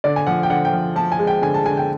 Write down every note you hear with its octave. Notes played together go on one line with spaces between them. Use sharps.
D3 D5
G#5
F3 F#5
G5
D3 F#5
G5
F3
F3 A5
G#5
G#3
G5
D3 G#5
A5
D3 G#5
G5